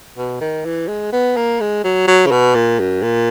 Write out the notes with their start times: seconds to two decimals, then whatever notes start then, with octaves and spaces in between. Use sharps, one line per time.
0.17 B2
0.41 D#3
0.65 E3
0.88 G#3
1.13 B3
1.36 A#3
1.60 G#3
1.84 F#3
2.08 F#3
2.26 C#3
2.31 B2
2.55 A#2
2.79 F#2
3.03 A#2